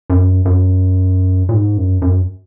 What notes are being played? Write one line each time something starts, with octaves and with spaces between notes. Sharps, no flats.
F#2
F#2
A#2
G#2
F#2
F#2